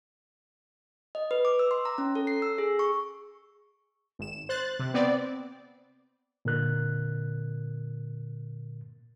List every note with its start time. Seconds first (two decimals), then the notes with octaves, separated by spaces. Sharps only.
1.15 D#5
1.31 B4
1.45 D6
1.59 E6
1.71 C6
1.85 A#5
1.98 C#4
2.15 A4
2.27 C7
2.42 E6
2.58 G#4
2.79 C#6
4.19 G#1 E7
4.49 C5 F#6 A6
4.79 C3
4.94 B3 C4 D5
6.45 A#2 D3 A#4 F#6